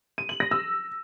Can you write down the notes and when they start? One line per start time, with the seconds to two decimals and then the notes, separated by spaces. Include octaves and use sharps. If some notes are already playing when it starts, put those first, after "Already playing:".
0.18 D#7
0.29 F#7
0.40 A#6
0.51 E6